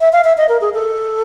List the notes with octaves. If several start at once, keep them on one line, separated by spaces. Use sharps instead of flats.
E5
F5
E5
D#5
A#4
G#4
A4